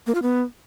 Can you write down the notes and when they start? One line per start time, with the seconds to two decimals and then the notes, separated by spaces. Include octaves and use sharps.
0.07 A#3
0.15 F4
0.22 B3